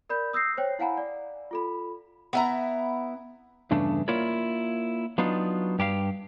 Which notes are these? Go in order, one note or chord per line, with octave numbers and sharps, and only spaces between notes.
A#4 D5 B5 G6
D#6 E6 G6 A#6 C7
C5 C#5 G5
E4 F5 F#5 G#5 A#5 B5
D5
F4 A4 B5
B3 E4 A#5
E2 G2 C#3 A3 D4
A#3 E4 F4 A#4 C#5 D5
F#3 B3 D4 D#4 F4
G2 G4 A#4 F5